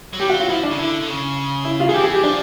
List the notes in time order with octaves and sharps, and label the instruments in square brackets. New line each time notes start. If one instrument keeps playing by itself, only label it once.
[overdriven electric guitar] F#3
[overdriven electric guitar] G3 [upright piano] G4
[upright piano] F#4
[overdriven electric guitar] F#3
[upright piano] F4
[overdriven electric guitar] F3 [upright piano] E4
[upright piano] D4
[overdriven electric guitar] C#3
[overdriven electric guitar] D3 [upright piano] E4
[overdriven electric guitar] D3
C#3
[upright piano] E4
F4
[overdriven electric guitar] D#3 [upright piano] G#4
[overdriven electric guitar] E3 [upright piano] G4
[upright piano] G#4
G4
[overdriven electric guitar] F3 [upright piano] D4